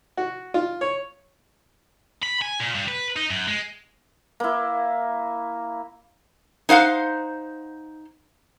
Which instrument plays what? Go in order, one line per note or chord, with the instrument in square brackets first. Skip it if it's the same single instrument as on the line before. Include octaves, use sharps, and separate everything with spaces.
[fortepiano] F#4
F4
C#5
[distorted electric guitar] B5
G#5
A#2
G2
B4
D#4
F#2
G#3
[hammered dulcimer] A#3 E4
[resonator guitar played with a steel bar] D#4 C5 F5 F#5